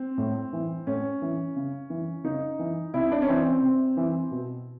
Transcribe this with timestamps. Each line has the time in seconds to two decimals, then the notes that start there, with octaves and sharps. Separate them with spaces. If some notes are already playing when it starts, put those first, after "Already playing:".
Already playing: C4
0.18 A2
0.53 E3
0.87 A2 C#4
1.22 E3
1.56 C#3
1.90 E3
2.24 C#3 D#4
2.59 E3
2.94 C3 E4
3.12 D4
3.22 C#4
3.28 E3 C4
3.46 C4
3.62 C3
3.97 E3
4.31 B2